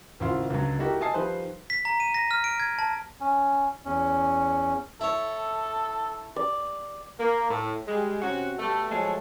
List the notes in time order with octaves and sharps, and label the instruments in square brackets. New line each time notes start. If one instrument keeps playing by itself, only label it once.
[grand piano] G#1 C#3 E4 F4 C6
C#2 D3 F#3
A3 D#4 E4 F#4 G4 A#4
D#5 E5 G#5 A5 D#6 C7
D#3 F3 G3 B4 C5
[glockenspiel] B6
A#5
D#7
A#6
F6
D7
G#6
A5
[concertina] C#4
[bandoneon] E2 C#4
[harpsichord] E4 C#5 [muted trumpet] A4
[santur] D5
[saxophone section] A#3
A2
G3 G#3
C3 C#4 F#4
B2 G3 A3
F3 F#3 G#3 A3